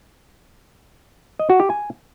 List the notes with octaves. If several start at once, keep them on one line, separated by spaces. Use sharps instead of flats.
D#5
F#4
G4
G#5